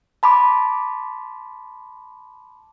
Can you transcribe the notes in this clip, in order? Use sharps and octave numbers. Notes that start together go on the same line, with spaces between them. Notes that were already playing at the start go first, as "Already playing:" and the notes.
A5 B5 C6 D6